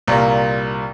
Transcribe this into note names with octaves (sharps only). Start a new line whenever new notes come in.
C2 A#2 G3 A#3